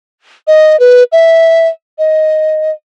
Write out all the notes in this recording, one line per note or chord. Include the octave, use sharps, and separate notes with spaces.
D#5
B4
E5
D#5